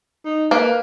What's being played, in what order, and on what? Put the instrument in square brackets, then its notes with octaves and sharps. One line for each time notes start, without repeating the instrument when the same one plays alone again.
[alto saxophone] D#4
[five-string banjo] A#3 [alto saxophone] B4